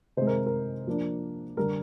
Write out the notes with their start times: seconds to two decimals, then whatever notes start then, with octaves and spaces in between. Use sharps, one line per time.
0.17 C3 D#3 G#3 C5
0.27 A#4
0.46 A#4
0.87 F3 A#3 D4
1.57 D3 G3 D4 A#4